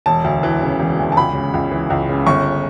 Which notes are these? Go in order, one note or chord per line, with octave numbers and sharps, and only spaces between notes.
E1 A5
D2
E3
C#3
E1
D2
A5
C#2 B5
C#3
C#2
E3
C#2
C#3
G1 C#6